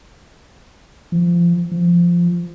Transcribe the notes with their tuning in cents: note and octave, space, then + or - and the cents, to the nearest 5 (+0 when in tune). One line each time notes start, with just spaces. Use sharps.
F3 -20
F3 -10